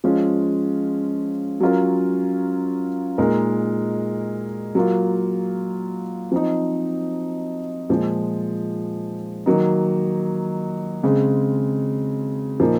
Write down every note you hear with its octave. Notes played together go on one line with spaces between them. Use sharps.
F3 G#3 C#4 F4
F#3 C#4 F4 A#4
A#2 G#3 D#4 A#4
F#3 A#3 F4
F3 C4 D#4
A#2 F3 G#3
D#3 F#3 A#3 D#4
C#3 G#3 C4
A#2 F3 A#3 D#4